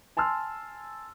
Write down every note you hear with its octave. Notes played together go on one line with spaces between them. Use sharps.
G#5 A5 C6 E6 F6